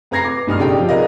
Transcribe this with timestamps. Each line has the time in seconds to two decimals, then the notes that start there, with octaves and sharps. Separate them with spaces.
0.11 F2 B4 A#5 G#6 A#6 C7
0.24 D6
0.47 B1 G2 D#6 F6
0.59 C#3 D#4 G4 A4 D5 G5
0.76 C3 F3
0.88 G#4 A#4 B4 D5 D#5 F5